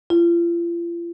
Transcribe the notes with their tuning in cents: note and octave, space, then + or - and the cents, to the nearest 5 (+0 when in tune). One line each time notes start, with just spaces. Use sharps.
F4 -40